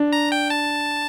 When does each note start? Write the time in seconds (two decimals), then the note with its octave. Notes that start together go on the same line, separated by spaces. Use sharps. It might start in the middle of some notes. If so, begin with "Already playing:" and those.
Already playing: D4
0.13 A#5
0.32 G5
0.50 A5